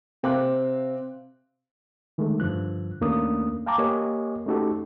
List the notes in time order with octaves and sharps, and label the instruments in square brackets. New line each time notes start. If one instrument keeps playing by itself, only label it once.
[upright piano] C3 C4 F5 D6 F#6
[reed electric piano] D3 D#3 G#3 A3
G2 D3 F3 F#6
D#2 A3 A#3 C#4 D4 D#6
F5 G5 A5 A#5 D6
A#3 G4 C#5 D#5 G#5
A3 C#4 D#4 F#4 G4 A4